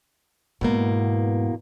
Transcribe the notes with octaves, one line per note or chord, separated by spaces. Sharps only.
E2 G#2 B2 A#3